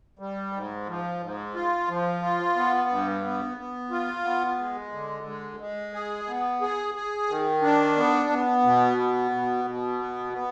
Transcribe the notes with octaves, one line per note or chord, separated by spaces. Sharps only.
G3
G#2
F3
G#2
F4
F3
F4
B3
G2
B3
B3
F4
B3
G#3
D3
G#3
G#3
G#4
B3
G#4
G#4
D#3
D4
B3
B3
B2
B3
B2
B2
B3
B3